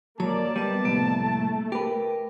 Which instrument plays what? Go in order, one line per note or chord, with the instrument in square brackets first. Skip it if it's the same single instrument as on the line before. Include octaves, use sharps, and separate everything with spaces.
[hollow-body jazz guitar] F2 F#3 [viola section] A#3 D5 [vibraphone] C#5 [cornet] A5
[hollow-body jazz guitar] G3 [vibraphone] B3 B4 D#5
[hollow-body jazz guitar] C2 F2 A2 [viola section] A3 [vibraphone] A#3
[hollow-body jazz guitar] G4 B4 [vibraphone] A#4